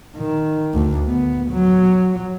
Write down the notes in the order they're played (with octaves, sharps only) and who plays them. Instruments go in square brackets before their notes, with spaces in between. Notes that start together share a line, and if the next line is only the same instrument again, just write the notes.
[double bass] D#3
D2
B3
F#3